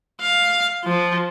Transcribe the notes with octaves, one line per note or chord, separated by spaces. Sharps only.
F5
F3